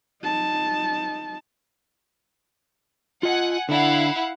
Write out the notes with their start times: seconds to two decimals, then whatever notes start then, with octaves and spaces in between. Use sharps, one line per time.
0.23 D#4 A5
3.23 F4 D#5 F#5 G#5
3.69 D3 D4 E4 F5 F#5